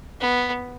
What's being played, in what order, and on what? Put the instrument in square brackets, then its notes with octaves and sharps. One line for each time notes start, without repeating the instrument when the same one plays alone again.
[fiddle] B3